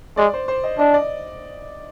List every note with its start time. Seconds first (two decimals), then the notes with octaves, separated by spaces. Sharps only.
0.17 G#3 D5
0.34 C5
0.48 C5
0.64 D#5
0.79 D4 D#5
0.94 D5